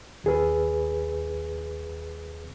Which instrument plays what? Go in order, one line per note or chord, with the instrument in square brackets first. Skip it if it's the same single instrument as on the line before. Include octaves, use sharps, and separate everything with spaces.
[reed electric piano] D#2 G#4 B4